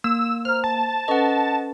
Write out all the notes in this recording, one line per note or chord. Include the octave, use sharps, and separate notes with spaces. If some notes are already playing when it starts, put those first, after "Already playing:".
A#3 E6
C5 A#5 F6
A5
C#4 A4 B4 D#5 F#5